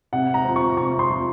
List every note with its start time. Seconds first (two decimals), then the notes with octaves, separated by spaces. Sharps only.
0.13 C3 F#5
0.34 A#5
0.45 F3 C4
0.56 C#6
0.77 C3 C#6
0.99 C6
1.10 F3 C4